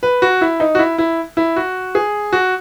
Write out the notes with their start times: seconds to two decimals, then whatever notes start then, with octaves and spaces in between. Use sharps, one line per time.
0.03 B4
0.22 F#4
0.41 E4
0.60 D#4
0.75 F#4
0.79 E4
0.98 E4
1.37 E4
1.56 F#4
1.95 G#4
2.33 F#4